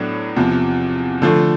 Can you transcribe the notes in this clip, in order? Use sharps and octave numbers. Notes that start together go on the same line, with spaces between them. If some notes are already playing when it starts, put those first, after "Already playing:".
Already playing: A2 F#3 B3 D4
E2 C3 F3
D3 F3 A3